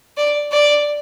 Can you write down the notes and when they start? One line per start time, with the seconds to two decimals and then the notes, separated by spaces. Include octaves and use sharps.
0.17 D5
0.52 D5